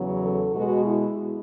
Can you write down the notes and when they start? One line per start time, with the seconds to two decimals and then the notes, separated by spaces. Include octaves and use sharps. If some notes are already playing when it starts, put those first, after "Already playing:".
Already playing: E2 C#3 F#3
0.22 A4
0.54 B2 G#3 F#4
0.85 E4